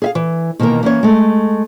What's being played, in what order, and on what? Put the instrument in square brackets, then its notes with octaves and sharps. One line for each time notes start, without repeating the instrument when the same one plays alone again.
[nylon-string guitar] G#4 E5 F5
E3
B2 D#3 E3 A#3 A#4
E3 A#3 C#4 C#5
G#3 A3